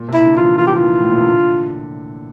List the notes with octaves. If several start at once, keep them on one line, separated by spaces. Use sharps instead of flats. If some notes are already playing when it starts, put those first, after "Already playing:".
Already playing: A#2
C3
E4
D3
E3 F4
F3
E3 F4
F3 G4
F4
E3
A2
A#2
C3
D3